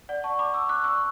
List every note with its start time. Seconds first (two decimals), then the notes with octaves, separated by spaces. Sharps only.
0.09 D5 F#5
0.24 A5 C#6
0.39 B5 D6
0.54 C#6 E6
0.69 D6 F#6
0.84 C#6 E6